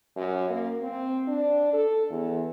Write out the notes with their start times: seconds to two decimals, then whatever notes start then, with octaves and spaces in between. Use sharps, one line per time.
0.16 F#2
0.50 A#3
0.82 C4
1.28 D4
1.73 A4
2.10 E2